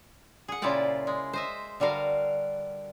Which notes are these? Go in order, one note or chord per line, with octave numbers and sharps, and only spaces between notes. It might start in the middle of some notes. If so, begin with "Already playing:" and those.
G#4 F#5
A#2 C#3 E4 F4 D5 G5
G#3
C5 D#5 E5
D3 G3 F#4 A#4 F5